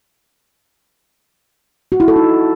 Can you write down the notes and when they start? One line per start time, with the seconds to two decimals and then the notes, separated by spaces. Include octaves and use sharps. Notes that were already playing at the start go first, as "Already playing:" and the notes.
1.92 F#4
2.00 E4
2.08 A4
2.16 D#4